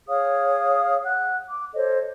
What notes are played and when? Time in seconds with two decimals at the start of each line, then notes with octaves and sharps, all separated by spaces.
0.08 G#4 C#5 F5 D#6
1.04 F#5 F#6
1.49 D6
1.74 A4 C5 C#5 D#5